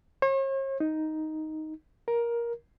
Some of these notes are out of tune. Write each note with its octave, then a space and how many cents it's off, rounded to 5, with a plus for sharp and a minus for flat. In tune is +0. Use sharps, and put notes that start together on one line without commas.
C#5 -45
D#4 +5
A#4 +15